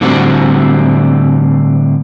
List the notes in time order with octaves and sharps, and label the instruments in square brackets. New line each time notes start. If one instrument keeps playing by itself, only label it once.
[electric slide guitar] A2 D3 G3 C4 F#4